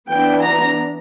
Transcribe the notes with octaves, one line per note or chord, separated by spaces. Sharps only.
E3 B3 D4 G5
A#5